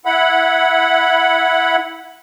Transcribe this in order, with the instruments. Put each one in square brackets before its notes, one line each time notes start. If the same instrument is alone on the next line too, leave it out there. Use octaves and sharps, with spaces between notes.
[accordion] E4 F#5 B5